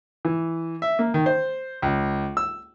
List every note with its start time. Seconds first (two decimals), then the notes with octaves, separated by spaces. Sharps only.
0.25 E3
0.82 E5
0.99 A#3
1.14 D#3
1.26 C5
1.82 C#2
2.37 E6